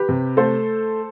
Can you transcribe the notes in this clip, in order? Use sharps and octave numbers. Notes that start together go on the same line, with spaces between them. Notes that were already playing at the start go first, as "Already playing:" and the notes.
Already playing: G4 B4
C3
A3 A4 C5